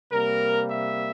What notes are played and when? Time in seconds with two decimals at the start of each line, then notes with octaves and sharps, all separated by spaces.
0.11 C3 G3 A#3 A#4
0.69 E5